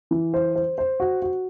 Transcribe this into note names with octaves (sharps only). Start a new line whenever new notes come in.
E3
C5
C5
C5
F#4
F#4